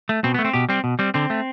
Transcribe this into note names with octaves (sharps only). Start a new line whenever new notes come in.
A3
B2 C4
B3
A3
C4
B2 G4
G3 C4
B2
G3 C4
D3 C4
A3